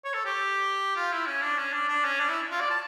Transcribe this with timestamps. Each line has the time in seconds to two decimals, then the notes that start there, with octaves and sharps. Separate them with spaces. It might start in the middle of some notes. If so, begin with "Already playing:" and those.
0.04 C#5
0.14 A4
0.25 G4
0.96 F4
1.12 E4
1.27 C#4
1.42 D4
1.58 C#4
1.73 D4
1.88 D4
2.04 C#4
2.20 D4
2.29 E4
2.51 F4
2.60 D5
2.70 A5